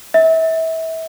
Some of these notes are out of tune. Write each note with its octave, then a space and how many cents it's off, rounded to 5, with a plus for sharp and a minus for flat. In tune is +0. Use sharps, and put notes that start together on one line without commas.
E5 -30